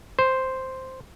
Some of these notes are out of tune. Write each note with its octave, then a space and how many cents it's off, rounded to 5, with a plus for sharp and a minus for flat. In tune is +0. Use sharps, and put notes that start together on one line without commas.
C5 +0